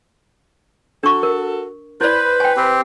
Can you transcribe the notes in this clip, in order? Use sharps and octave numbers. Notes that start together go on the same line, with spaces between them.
D4 F#4 A4 C#6
A#4
E4 B4 C5 D5
G5 G#5
C4 G4